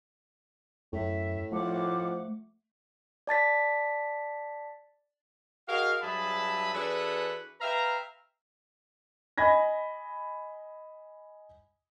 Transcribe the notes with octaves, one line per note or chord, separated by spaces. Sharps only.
F#2 A2 E5
F3 A3 F#5 D6
D5 A5 A6 B6
F#4 G#4 A#4 D#5 F5
G2 F#3 G#4 E5 A5 B5
E3 D4 F#4 G#4 A4 B4
B4 E5 F5 G5 A#5
D#5 G#5 B5 G#6 A#6